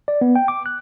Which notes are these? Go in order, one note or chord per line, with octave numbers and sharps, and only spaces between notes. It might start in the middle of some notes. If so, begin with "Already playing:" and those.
D5
B3
G5
D6
F#6